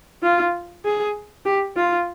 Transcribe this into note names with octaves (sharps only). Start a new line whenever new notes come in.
F4
G#4
G4
F4